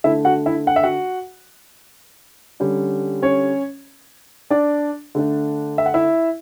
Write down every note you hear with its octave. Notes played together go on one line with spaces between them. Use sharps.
D3 A3 D4 E4 E5
F#4 F#5
E4 E5
F#5
E5
F#4 F#5
D3 G3 C#4
C#4 C#5
D4 D5
D3 A3 D4
E5
F#5
E4 E5